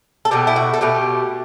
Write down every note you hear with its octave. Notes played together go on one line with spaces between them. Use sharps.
A4
B2 A3 G4
E4
F#4
A4
B2 A3 G4